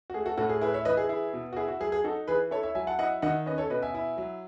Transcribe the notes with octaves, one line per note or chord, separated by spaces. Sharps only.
F#4
A3 G#4
F#4 A4
A2 F#4 A4
G#4
E4 G#4 B4
C#5 E5
E3 B4 D#5
G#4
E4 G#4
B2
F#4
E4 G#4
F#4
F#3 G#4
G#4
D#4 F#4 A4
E3 G#4 B4
E4 A4 C#5
C#5 E5
F#3 E5 G#5
F#5 A5
E4 D#5 F#5
D#3 D#5 F#5
C#4 B4 D#5
A4 C#5
B2 B4 D#5
E5 G#5
E4
F#3